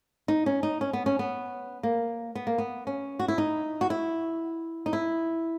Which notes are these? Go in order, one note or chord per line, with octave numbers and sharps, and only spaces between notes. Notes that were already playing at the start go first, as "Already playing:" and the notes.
D#4
C#4
D#4
C#4
B3
C#4
B3
A#3
B3
A#3
B3
C#4
F#4
E4
D#4
F#4
E4
D#4
E4